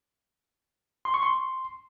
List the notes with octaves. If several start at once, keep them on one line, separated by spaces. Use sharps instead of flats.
C6
C#6
C6